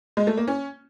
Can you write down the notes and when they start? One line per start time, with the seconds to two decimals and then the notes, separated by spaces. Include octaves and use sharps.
0.17 G#3
0.27 A3
0.37 A#3
0.48 C#4